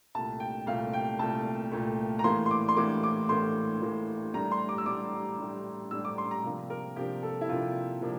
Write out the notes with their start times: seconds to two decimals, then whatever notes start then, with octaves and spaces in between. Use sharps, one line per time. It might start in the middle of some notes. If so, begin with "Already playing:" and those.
0.15 C2 A#2 A3 A5
0.40 G5
0.66 C2 A#2 A3 F5
0.93 G5
1.19 C2 A#2 A3 A5
1.72 C2 A#2 A3
2.19 A#5
2.24 A2 E3 A#3 C6
2.46 C6
2.51 D6
2.68 C6
2.77 A2 E3 A#3 D6
3.03 D6
3.29 A2 E3 A#3 C6
3.82 A2 E3 A#3
4.34 A2 G3 D4 A#5
4.52 C6
4.69 D6
4.78 E6
4.86 A2 G3 D4 D6
5.39 A2 G3 D4
5.91 A2 G3 D4 E6
6.05 D6
6.18 C6
6.31 A#5
6.43 C3 F3 A#3 D4
6.70 A#4
6.96 C3 F3 A#3 D4 G4
7.23 A4
7.41 E4
7.49 C3 F3 A#3 D4 F4
8.02 C3 F3 A#3 D4